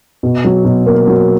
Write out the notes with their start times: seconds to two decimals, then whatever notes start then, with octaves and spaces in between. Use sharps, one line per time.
0.23 B2
0.45 F#3
0.65 B2
0.86 A#3
1.08 F#3